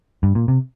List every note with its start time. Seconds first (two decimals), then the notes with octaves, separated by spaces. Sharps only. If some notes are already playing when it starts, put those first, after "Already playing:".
0.23 G2
0.35 A#2
0.48 C3